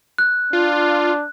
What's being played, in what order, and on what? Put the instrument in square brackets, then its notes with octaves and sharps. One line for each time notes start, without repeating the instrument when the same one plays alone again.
[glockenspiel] F#6
[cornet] D4 [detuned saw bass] F4